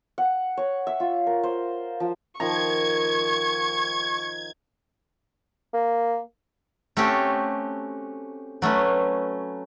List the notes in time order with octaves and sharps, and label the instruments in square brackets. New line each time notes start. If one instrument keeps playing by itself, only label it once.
[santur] F#5
C#5
E5
F4
A#4
C5
F3
[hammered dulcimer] D#3 F3 A#5 [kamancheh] C#6 [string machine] G#6
[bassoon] A#3
[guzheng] A3 C4 C#4 F#4 G4 A4
F#3 A3 C#4 B4